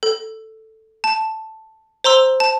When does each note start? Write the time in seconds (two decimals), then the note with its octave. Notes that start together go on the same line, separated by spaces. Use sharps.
0.03 A4
1.04 A5
2.04 C5 A#5 C6 E6
2.40 A5